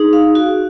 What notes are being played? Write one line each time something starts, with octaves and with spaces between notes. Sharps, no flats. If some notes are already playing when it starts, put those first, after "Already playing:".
Already playing: D#4 G#4
F5
F#4